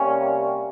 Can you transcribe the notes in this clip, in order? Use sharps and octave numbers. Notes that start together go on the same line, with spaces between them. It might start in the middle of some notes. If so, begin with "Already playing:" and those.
Already playing: C3 G3 A#3 C#4